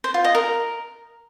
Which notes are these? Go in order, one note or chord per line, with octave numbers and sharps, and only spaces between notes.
C5
F4
D#5
A#4